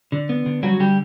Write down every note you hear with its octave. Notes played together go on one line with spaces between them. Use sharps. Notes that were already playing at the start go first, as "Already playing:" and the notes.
D3
B3
D3
F#3 G3 F#4
D3 G3 G4